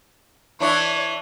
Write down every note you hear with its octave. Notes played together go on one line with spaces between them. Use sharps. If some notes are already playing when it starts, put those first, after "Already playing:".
E3 D4 E4 C#5